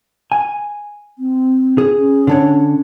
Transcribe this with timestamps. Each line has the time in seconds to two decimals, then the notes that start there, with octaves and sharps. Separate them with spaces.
0.32 G#5
1.19 C4
1.78 G#4
1.97 C#4
2.27 D3 D4 C#5